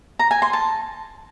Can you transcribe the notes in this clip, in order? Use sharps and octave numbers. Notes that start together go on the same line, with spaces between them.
A#5
G#5
C6
A5